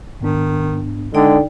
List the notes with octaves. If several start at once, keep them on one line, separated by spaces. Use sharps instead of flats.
G#2 D#3 B3 D4
D3 G#3 D#4 D5 G5